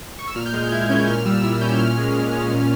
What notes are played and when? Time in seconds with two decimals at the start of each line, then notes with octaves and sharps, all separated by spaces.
0.19 C#6
0.27 E6
0.36 A#2 F6
0.46 G6
0.54 G#3 F6
0.72 E4 G#6
0.90 C#4 G6
1.08 A#2 F6
1.26 G3 E6
1.43 E4 F6
1.61 C#4 G6
1.79 A#2 F6
1.97 G#3
2.16 A#2
2.33 C#4
2.51 A#2 F6